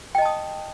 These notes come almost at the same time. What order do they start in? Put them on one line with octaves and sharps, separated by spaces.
G5 D#5 A5 D#6